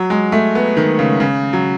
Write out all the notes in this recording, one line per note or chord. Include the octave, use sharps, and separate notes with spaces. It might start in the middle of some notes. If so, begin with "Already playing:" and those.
Already playing: F#3
G#3
A3
B3
D#3
C#3
C#3
F#3